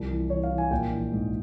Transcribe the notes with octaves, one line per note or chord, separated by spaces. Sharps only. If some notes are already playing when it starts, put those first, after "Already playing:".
Already playing: C2 F3 A#5
E3
E3 C#5
F5
E3
G#5
A#1 G5
E3
G#2